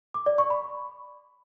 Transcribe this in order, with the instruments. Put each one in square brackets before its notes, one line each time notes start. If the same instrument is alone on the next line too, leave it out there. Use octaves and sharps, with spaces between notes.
[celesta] D6
D5
C#6
B5